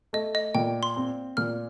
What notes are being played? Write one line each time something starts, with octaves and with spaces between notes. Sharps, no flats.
A3 D#5
D#5
A#2 G5
C6
C4
A#2 F6